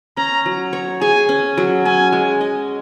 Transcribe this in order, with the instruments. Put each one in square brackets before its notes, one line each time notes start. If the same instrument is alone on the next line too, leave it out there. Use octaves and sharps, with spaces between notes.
[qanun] C#4 [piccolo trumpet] A#5
[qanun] F#3
C#5
[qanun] G#4 [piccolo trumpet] G#5
[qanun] C#4
F#3
[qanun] C#4 [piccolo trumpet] G#5
[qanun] G#3
D#5